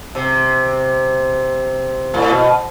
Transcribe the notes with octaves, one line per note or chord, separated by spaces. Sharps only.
C3
A2
B2